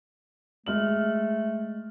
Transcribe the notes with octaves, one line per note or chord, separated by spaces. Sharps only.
G#3 A3 F6 F#7